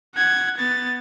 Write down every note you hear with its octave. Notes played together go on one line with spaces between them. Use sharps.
F#5 G#6
B3 A6